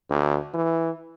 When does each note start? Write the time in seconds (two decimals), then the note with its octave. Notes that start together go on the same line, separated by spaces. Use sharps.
0.10 D2
0.54 E3